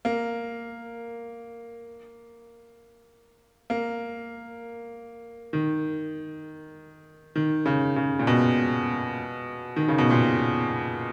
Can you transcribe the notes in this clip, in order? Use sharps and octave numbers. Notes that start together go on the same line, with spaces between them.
A#3
A#3
D#3
D#3
C#3
C#3
A#2
B2
D#3
C#3
B2
A#2